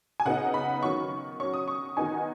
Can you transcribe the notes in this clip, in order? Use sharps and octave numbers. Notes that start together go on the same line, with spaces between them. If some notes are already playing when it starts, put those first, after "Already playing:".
G#5
C#3 B3 D#4 F#5
B5
D#3 F#3 C#4 C#6
F#3 C#4 C#6
D#6
C#6
D#3 B3 D#4 G#5